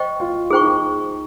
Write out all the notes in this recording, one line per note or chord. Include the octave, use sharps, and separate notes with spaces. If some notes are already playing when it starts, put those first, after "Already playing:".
Already playing: C5 D#5 G5 C#6
F4
D#4 G#4 C5 G5 C#6
D#4